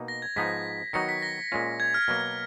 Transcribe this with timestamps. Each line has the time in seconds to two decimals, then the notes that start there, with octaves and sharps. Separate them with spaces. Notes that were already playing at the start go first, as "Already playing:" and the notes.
Already playing: B2 A#3 D#4
0.08 A#6
0.22 G#6
0.36 G#2 F3 B3 D#4 B6
0.93 D#3 F#3 B3 D#4 F#4 A#6 C#7
1.09 B6
1.22 A#6
1.52 A#2 G#3 C#4 F4
1.80 G#6
1.94 F6
2.08 B2 F#3 A#3